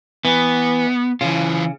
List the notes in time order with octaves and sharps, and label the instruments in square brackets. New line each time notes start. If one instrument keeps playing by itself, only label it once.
[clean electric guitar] E3 [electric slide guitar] B3
[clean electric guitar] C#3 [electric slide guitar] E3 F4